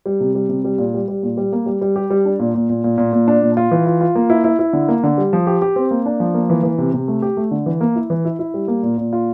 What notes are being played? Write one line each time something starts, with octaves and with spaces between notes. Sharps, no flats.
G3
C3
G3
C3
G3
A#2
G3
G3
A#2
G3
A#3
G3
G3
G4
G3
D4
A#2
A#2
A#2
A#2
A#2
A#2
D4
A#2
F4
E3
F4
F4
A#3
E4
E4
E4
D3
A#3
D3
G3
F3
G4
G4
C4
A#3
D4
F3
A#3
E3
E3
C3
C3
A3
G4
A3
D3
E3
A#3
E4
E3
E4
E4
G3
A#3
A#2
A#2
F4